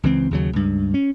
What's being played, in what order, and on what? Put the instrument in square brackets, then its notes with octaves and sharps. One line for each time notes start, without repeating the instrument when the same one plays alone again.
[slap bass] C#2 E3 C4
D#2 C#3 F#3
C#2 G2
C#4